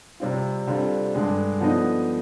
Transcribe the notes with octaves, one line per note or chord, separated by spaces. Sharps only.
C3 G3 C4 F4
D3 G3 C4 F4
G2 D3 G#3
D3 F3 B3 D#4